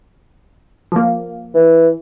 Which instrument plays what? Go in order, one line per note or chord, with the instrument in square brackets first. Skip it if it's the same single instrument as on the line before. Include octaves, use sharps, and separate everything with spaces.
[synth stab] F3 A#3
[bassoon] E3